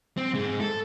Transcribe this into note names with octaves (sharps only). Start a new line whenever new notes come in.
C4
G#2 G#3
A4